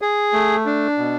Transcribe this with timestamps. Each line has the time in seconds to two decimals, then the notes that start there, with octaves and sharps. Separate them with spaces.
0.02 G#4
0.33 A3
0.66 D4
0.98 B2